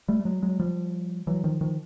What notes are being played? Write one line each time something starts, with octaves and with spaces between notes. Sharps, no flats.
G3 A3
A3
F#3 G#3
F#3 G#3
F3 G3
E3 F#3
D#3 F3
D#3 F3